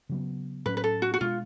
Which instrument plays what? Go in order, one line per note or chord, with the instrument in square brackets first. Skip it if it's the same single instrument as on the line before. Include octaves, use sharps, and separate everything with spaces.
[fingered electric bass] C#3 F#3 B3
[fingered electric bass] A2 F#3 C#4 [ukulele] B4
[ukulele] B4
A4
F#4
F#4
[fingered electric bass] B2 G#3 D4 [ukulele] F4